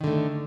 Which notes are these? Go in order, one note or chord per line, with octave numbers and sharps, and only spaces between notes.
D3 D#3 A3